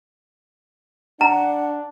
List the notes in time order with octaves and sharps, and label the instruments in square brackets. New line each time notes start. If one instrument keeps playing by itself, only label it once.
[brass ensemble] D4 [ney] F#5 [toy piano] A#5